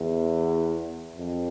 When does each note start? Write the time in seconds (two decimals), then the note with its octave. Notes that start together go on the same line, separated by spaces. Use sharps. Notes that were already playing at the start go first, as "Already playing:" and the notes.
Already playing: E2
1.16 F2